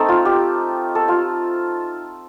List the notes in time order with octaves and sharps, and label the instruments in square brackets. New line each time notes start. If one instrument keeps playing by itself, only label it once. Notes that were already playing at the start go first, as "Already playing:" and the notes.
Already playing: [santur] A3 C4 D#4 A4
F4
G4
A4
F4